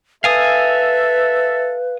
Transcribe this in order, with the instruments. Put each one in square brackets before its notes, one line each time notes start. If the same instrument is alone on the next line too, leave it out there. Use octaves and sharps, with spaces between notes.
[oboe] A4 [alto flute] B4 [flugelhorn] E5 [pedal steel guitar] F5 G#5 D#6